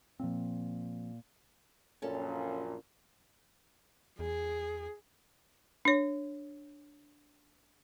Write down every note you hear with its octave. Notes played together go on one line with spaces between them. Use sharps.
A#2 F3 C4
A#1 F#2 A#2 C#4 A4
E2 G#4
D4 C#5